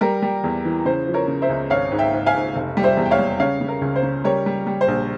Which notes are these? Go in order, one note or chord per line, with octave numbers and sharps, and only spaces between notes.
G3 A#4
G3
E2
E3
C#3 C5
F3
A#4 C#5
C#3
C5 E5
C#2
G#1 C#5 F5
G#2
E5 G5
G#2
F5 G#5
G#2
F1
G3
C5 E5
E2
G5
C#5 F5
G3
C#3 C#5 F5
C#3
A#4
C#2
C5
C#3
G3 A#4 C#5
G3
G3
C5
A#1